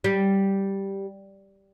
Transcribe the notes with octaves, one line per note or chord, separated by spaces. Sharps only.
G3